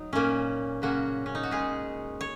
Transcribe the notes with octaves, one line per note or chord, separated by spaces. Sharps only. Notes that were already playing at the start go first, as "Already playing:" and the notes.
Already playing: F#3 D#4
A#2 A#3 C#4
C#3 F#3 A#3 C#4 F#4
C#4
D#4
F#4
A#2 G#3 C#4 G#4
C#5